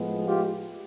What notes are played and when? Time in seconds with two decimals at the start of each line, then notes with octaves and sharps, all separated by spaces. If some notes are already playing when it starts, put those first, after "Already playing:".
Already playing: A2 F3 G#3 B3
0.27 F4 G4